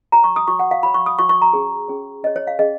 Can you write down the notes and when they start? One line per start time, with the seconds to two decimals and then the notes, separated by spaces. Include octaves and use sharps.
0.12 F#4 C#5 A#5
0.24 C#6
0.36 D#6
0.47 F#4 C#5 C#6
0.59 F#5
0.71 F5
0.83 F#4 C#5 B5
0.94 C#6
1.06 D#6
1.18 F#4 C#5 C#6
1.29 C#6
1.42 A#5
1.53 C#4 G#4 C#5
1.88 C#4 G#4 C#5
2.23 C#4 G#4 C#5 D#5
2.36 C#5
2.47 F5
2.59 C#4 G#4 C#5 D#5